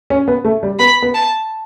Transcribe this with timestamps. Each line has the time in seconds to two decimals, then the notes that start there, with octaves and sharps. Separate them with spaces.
0.10 C#4
0.28 B3
0.45 A3
0.63 G3
0.79 B3 B5
1.02 B3
1.14 A5